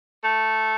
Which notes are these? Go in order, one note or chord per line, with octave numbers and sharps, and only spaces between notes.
A3